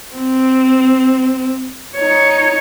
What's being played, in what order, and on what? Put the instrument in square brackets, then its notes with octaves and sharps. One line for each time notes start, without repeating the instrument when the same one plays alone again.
[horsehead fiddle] C4
D#4 C#5